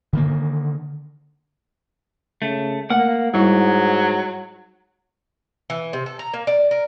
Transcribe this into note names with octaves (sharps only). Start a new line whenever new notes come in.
D3 D#3 A#3
C#3 A3
A3 A#3 F#5
G#2 F#3 G3 E4 C#6
E3
C3
A4
A#5
A#3
D5
A#4